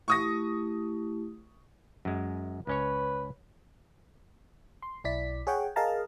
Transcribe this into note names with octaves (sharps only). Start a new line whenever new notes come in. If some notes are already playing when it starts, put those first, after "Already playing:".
A3 E4 G4 C#6 D#6 A#6
F#2 G#3
C#2 C#4 B4 C#5
C6
B1 E4 D5 B6
G#4 C#5 F#5 G5
G#4 A#4 D#5 F5 A5 A#5